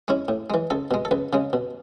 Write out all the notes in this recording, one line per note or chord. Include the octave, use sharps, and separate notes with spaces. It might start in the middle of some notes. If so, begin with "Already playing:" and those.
G#3 C#4 E4
A2
E3 G#3
C#2 A4
B2 G#3
A4
C#2 B4
C#3 G#3
B2